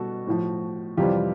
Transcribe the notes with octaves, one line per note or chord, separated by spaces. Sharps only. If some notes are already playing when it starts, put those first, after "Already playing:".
Already playing: B2 G3 F#4 A4
A2 F3
F2 C3 E3 G3 F4 G4